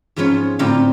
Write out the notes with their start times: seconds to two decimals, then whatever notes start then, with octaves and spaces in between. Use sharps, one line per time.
0.16 G#2 F3 B3 C#4 F4 C#5
0.59 A2 D3 C4 F4 G5 A#5